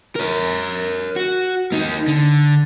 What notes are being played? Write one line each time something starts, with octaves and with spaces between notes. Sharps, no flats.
A#4 C#5
F#4
A#3 D#4
D3